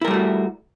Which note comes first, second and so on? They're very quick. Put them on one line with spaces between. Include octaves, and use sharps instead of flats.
E4 A#4 G3 A3 F#4